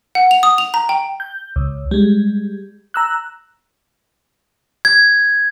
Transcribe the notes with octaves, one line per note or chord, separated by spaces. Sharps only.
F#5
F7
D#6
F7
A#5
G5
G6
C#2
G3 G#3
A#5 E6 F#6
G#6